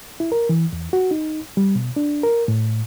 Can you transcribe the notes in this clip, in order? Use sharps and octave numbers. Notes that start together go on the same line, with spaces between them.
E4
A#4
E3
E2
F#4
D#4
G3
B2
D4
A#4
A2